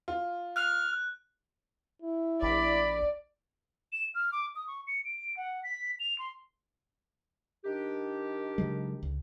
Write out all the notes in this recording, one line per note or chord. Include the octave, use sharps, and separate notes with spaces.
F4
F6 F#6
E4
A#1 D5 B5
E7
F6
D6
D#6
C#6
C#7
D7
F#5
B6
F7
C6
D#3 D4 G4
C#3 F#3 G#3
C#2